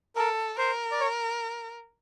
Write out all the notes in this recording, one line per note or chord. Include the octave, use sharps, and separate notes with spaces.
A4 A#4
A#4 C5
D5
C#5